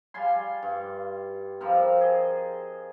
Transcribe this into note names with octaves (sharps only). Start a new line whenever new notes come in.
G3 F4 G#5 C6
G2
F3 G3 C4 A#4
G#4 D#5